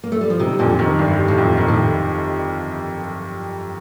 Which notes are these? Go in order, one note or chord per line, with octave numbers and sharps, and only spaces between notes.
A#3
A3
G3
F3
C3 D#3 G3
F2 A#2 D3
A#2
C3 D#3
G1 G2
G3
A2
F2
A#2 D#3
A2